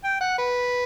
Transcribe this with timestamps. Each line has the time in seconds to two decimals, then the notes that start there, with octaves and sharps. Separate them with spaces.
0.04 G5
0.21 F#5
0.38 B4